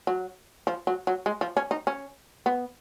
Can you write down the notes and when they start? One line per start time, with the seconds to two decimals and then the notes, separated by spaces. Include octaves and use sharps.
0.07 F#3
0.67 F3
0.87 F#3
1.07 F#3
1.26 G#3
1.41 F3
1.57 C#4
1.71 D#4
1.87 C#4
2.46 B3